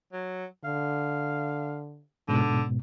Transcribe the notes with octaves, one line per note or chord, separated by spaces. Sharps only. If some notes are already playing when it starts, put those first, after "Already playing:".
F#3
D3 F5
G#2 B2 D3